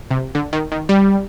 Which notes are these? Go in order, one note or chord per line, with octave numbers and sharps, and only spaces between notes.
C3
D3
D#3
D#3
G3